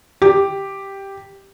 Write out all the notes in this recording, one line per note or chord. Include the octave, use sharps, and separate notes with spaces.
G4